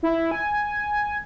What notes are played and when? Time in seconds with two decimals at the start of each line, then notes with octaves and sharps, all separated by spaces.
0.03 E4
0.31 G#5